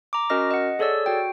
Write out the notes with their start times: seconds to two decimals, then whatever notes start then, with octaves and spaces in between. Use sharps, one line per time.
0.13 A#5 D6
0.30 C#4 F#4 A#4 D#5 F6 A#6
0.51 D#5 F#5
0.79 G#4 A4 C#5 D5 E6
1.06 F#4 G5